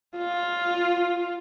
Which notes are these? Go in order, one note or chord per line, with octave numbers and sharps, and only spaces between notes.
F4